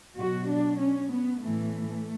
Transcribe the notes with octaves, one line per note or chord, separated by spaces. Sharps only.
B2 F#3 F#4
D4
C#4
B3
A2 E3 A3